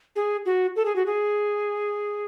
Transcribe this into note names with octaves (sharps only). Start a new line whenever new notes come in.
G#4
F#4
A4
G#4
F#4
G#4